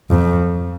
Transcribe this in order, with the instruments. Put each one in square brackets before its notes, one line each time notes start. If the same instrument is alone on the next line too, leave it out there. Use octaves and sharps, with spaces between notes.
[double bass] F2